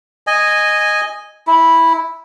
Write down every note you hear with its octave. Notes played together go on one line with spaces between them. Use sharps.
D#5 G#5
E4